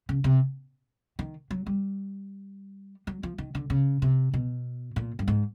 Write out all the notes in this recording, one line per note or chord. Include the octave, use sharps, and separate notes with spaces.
C#3
C3
D#3
F#3
G3
F#3
F3
D#3
D3
C#3
C3
B2
A#2
G2
G#2